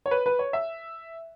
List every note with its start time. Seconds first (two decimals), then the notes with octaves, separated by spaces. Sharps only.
0.06 C#5
0.11 B4
0.26 B4
0.39 C#5
0.53 E5